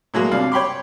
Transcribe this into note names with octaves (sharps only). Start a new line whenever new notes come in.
A2 F#3 G#3 A#3
C2 G3 D4 F5
C#5 G5 B5 C6 D6